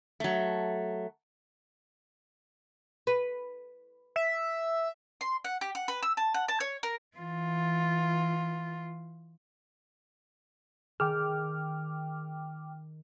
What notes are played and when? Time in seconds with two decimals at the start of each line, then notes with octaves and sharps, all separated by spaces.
0.20 F#3 A3
3.07 B4
4.16 E5
5.21 C6
5.45 F#5
5.61 G4
5.75 F#5
5.88 B4
6.03 E6
6.17 A5
6.34 F#5
6.48 A5
6.60 C#5
6.83 A#4
7.17 E3 F4
11.00 D#3 G#4 G5 D6 F6